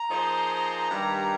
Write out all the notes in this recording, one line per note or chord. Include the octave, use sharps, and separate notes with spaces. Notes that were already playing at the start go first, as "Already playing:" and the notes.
Already playing: A#5
F3 A#3 D#4 G#4 C5
G2 D#3 G3